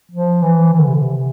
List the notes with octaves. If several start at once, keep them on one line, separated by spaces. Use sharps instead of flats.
F3
E3
E3
D3
C3
D3
C3